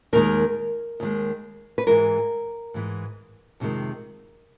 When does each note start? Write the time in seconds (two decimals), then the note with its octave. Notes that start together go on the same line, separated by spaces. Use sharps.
0.13 D#2 D#3 G#3 A#4
1.00 D#2 D#3 G#3
1.78 B4
1.86 G#2 E3 G#3 A#4
2.74 G#2 E3 G#3
3.60 F2 C3 D#3 G#3